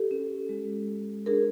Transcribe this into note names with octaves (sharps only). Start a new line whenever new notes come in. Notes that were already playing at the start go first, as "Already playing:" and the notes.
Already playing: G4 A4
C#4
G#3
G#3
D4 G#4 A#4